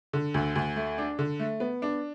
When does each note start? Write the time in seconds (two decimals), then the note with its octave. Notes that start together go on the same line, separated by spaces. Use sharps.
0.13 D3
0.34 D2
0.56 D2
0.76 A3
0.98 D4
1.19 D3
1.39 A3
1.60 B3
1.82 D4